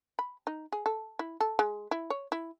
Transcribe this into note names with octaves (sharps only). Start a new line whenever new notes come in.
B5
D#4
G#4
A4
E4
A4
G#3
E4
C#5
E4